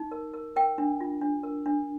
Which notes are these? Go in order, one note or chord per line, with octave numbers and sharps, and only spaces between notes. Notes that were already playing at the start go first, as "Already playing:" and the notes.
Already playing: D#4
A#4
A#4
A#4 G5
D4
F4
D4
A#4
D4